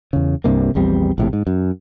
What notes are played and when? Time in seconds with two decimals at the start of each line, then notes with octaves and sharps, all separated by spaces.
0.13 E2 C#3
0.44 C2 G2 C3 A#3
0.75 A#1 E2 G3 C4
1.18 A#1 A2 C3
1.33 G#2
1.47 F#2